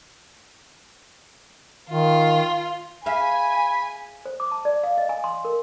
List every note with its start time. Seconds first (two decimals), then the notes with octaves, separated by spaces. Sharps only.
1.90 D#3 F4
3.06 G#4 E5 F5 G#5 B5
4.26 C5
4.40 D6
4.52 A5
4.65 D5
4.84 F5
4.98 D#5
5.09 G#5
5.24 C6
5.45 A#4